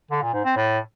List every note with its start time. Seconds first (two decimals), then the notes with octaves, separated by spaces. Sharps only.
0.11 D3
0.22 A#2
0.33 G#2
0.45 C4
0.56 A2